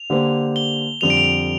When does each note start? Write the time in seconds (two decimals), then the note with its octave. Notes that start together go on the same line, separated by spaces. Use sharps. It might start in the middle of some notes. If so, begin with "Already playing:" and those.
Already playing: F7
0.10 D3 A#3 G4 C5
0.56 G7
1.01 F2 D3 G3 F7
1.10 D7
1.17 F7